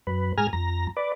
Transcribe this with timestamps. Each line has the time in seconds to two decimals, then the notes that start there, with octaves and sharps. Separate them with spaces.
0.07 F#2 B4
0.38 G#2 G#4 G#5 A#5 F6
0.53 F2 A#5
0.97 B4 D5